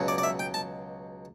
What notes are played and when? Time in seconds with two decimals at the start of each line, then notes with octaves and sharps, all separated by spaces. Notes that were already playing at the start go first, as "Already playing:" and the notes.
Already playing: C#2 B2 F#3
0.08 D5
0.18 D5
0.23 E5
0.39 G5
0.54 A5